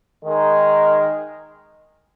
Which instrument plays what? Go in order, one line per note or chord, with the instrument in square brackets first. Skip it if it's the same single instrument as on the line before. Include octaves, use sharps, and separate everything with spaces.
[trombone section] D#3 G#3 D#4 A#4